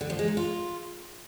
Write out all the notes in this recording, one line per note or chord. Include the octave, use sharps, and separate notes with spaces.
D3
F3
G#3
D#4
F4